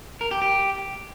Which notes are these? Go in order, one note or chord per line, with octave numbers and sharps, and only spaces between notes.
A#4
G4
G4